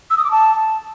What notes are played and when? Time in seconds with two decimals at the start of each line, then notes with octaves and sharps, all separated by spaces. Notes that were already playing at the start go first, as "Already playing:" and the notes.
0.10 E6
0.17 D#6
0.24 D6
0.31 A5